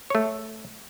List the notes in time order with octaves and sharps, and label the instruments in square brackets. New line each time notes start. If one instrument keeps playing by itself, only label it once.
[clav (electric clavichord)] A3 C#5